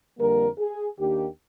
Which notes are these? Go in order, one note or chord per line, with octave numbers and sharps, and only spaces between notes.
F2 D3 G3 A#3 A#4
G#4
D#2 D#3 A#3 D4 G4